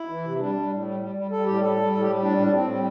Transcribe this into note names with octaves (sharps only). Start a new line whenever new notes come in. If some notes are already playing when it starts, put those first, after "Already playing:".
Already playing: E4
E3
C3
G3 D4
G3
A2
G3
G3
G3
G3 A4
A2 G4
G3 A4
G3
A2 A4
G4
G3
A2 D4
A2 D4
A2 C4
G3